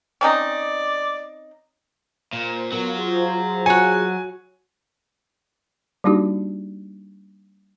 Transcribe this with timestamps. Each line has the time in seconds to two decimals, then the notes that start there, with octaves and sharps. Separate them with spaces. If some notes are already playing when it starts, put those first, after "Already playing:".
0.21 C4 C#4 D#4 D5
2.33 A#2 C5
2.72 F#3 B3 F4 A#4
2.95 F4 G#4 C5
3.66 F#4 C#5 G#5
6.04 G3 A#3 D4 D#4 F#4 G4